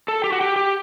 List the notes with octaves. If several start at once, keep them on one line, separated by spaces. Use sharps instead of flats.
A4
G4
F#4
G4
G4